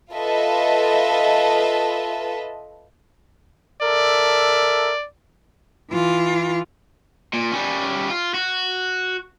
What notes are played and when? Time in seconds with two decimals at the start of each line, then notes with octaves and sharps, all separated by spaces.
0.12 F4 A4 B4 D#5 E5
3.82 A4 A#4 D5 E5
5.92 E3 F4
7.33 A#2
7.52 G3 C#4
8.10 F4
8.34 F#4